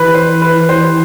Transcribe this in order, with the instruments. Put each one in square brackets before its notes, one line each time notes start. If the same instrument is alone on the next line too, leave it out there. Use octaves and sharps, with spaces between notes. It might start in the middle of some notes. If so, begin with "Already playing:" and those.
Already playing: [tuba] E3 [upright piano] B4
[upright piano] C5
B4
C5